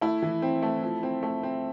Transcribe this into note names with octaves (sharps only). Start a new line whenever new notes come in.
A3 E4
E3
C4
A3
F3
C4
A3
C4